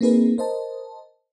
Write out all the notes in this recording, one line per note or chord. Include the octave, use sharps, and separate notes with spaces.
A#3 C4 D#4 G#4 A#4 B4
A#4 C5 D#5 A5